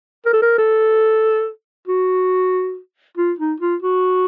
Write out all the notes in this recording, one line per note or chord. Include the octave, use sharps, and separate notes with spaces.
A#4
A4
A#4
A4
F#4
F4
D#4
F4
F#4